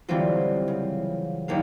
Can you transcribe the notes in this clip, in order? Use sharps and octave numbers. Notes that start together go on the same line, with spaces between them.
D3 E3 F#3 G3 C4 F4
C#3
F#1 D#2 F5